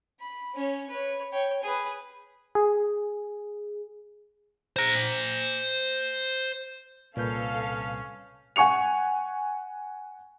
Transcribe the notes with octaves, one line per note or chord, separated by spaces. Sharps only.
B5
C#4 C#5
B4 C#5
C#5 G5
G#4 B4
G#4
C5 A#5
C2 A#2 C#4 A4 B4 F5 G6
F#5 G#5 C#6 C#7 F7